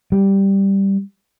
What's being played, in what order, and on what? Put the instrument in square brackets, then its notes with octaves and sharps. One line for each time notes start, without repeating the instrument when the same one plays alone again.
[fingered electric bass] G3